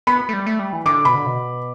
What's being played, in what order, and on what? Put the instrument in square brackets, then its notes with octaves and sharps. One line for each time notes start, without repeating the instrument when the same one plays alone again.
[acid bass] B3 [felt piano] B5
[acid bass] A3
G3
A3
G3
E3
[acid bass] D3 [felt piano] D6
[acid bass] B2 [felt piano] B5
[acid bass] D3
B2